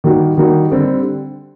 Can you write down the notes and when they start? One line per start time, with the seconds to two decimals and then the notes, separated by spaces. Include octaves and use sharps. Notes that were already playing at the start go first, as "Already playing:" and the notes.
0.04 D#3 G3 A#3 D#4 F#4
0.37 D#3 G3 A#3 D#4 F#4
0.72 D3 G3 C4